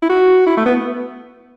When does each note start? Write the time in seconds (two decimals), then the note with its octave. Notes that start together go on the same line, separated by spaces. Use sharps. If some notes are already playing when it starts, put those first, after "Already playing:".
0.02 E4
0.10 F#4
0.47 E4
0.57 A3
0.66 B3